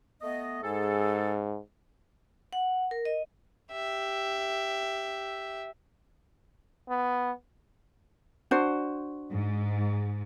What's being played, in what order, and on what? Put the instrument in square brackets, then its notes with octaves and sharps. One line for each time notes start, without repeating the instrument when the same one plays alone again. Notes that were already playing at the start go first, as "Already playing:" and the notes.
[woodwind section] A3 B3 D#5
[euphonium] G#2 [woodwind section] G#4 A4
[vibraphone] F#5
A#4
D#5
[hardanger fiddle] G4 E5
[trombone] B3
[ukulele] D4 F#4 C5
[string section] G#2